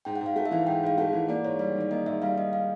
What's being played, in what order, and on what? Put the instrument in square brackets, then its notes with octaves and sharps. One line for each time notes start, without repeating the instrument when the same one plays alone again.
[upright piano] G#2 [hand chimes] G5
[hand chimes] F#5
[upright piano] G#2
[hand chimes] F5
[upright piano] A3 [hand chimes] F#5
[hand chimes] E5
[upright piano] E3 [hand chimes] F5
[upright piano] G#2 [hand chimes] G5
[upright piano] G#2 [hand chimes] F5
[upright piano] A3 [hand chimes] F#5
[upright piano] E3
[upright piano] A#3 [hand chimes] D5
[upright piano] G#2 [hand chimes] C#5
[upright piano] G3 [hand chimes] D5
[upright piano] D#3 [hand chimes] D5
[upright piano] A#3 [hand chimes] D#5
[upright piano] G#2 [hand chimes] E5
[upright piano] G3 [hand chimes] F5
[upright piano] D#3 [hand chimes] D#5
[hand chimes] F5